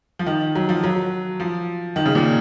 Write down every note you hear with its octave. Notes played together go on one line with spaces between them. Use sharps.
F3
D#3
F#3
F3
F#3
F3
D#3
C#3
A#2